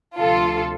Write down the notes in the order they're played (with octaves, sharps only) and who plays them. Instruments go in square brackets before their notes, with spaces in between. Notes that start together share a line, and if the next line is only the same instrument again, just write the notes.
[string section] D2 C3 F3 F4 A4